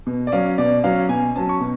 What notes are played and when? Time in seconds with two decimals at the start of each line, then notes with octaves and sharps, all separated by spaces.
0.07 B2
0.27 D5
0.32 F#3 C#4 F5
0.58 B2 D5
0.84 F#3 C#4 F5
1.09 B2 G#5
1.36 F#3 C#4 A5
1.49 C#6
1.61 B2